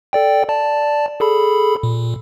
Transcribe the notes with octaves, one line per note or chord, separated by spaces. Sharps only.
A4 D5 G5
D5 A5
G#4 A4 B5
A#2